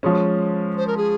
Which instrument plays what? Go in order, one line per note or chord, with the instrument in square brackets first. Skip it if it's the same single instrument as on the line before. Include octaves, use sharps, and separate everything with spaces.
[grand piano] F3 G#3 C#4
[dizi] C5
A#4
G#4